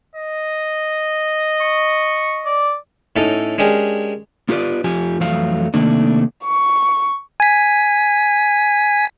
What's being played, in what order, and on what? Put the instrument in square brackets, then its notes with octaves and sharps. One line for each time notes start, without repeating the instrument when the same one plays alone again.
[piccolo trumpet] D#5
[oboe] C#6
D5
[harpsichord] A2 C#4 D#4 A4 A#5
G#3 C#4 D4 G4 G#4 A#4
[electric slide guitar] B3 F4 G4 B4 D5
F2 F3 G4 G#5
F2 E3 F#3 A3 F5
C3 D#3 A3 A#3 D4
[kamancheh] C#6
[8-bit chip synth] G#5 B6